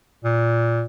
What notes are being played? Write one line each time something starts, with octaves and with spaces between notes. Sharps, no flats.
A#2